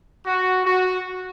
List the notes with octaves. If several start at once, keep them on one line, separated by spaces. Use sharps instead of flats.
F#4
F#4